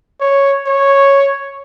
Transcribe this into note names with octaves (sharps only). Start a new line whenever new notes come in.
C#5
C#5